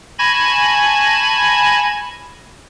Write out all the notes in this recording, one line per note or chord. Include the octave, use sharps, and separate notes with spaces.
G#5 A5 B5 C#6 G#6 A#6